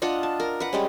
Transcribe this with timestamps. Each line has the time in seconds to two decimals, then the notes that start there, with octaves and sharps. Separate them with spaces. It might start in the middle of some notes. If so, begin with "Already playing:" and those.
0.02 D4 F4 D#5 F#5
0.23 A5
0.40 A#4
0.60 B4 F#5
0.73 G3 G#3 C#4